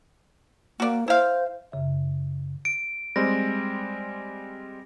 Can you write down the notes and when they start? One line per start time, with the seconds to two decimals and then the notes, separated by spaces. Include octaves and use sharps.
0.80 A#3 F#4 D5
1.08 E4 C5 F5
1.72 F#2 C#3 E5
2.65 D7
3.16 G3 G#3 C4 A#6